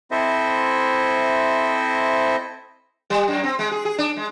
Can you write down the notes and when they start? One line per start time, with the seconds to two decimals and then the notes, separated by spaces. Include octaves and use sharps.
0.11 C4 E4 A4 C5 D#5 E5
3.10 G3
3.28 F#2
3.44 C4
3.59 G#3
3.71 G#4
3.85 G#4
3.98 D4
4.17 G#3